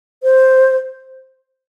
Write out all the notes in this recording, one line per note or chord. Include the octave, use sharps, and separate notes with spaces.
C5